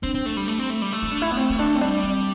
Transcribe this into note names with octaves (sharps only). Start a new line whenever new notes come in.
C4 D4
C4
A3
G3
A3
C4
A3
G3
A3
E4
D4
E4
B3
C4
C4
D4
C4
G3 D4
C4